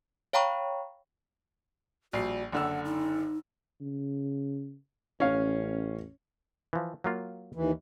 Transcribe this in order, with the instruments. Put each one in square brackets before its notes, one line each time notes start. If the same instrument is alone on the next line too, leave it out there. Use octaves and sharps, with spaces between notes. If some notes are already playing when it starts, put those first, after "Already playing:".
[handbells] C#5 F5 G5 A#5 B5 C#6
[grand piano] A#1 G3 C7 [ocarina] F#4
[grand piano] F#1 D3 E6 [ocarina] F#5
[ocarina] D#4
[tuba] C#3
[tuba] A1 [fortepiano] C#4 F5
[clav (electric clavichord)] E3 F3
F#3 A#3 F4
[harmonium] D#2 E3